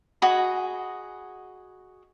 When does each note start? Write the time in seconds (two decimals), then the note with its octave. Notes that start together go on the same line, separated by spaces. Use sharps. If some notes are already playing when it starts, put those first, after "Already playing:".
0.22 F#4 G#4 D#5 B5